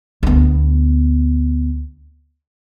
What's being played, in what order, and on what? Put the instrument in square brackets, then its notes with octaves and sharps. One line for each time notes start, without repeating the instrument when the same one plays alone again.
[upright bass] D2 B3